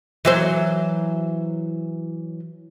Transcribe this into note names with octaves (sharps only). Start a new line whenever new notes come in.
E3 F#3 C5